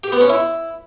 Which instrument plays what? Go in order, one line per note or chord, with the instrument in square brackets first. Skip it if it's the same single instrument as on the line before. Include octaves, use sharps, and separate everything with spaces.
[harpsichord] G4
B3
C#4
E4